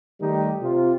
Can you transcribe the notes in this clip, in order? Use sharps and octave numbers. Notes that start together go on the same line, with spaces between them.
D#3 G3 A3 D#4 G4
C3 F4